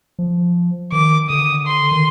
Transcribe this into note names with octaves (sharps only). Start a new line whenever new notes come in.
F3
D#3 D6
D3 D#6
C6
D#3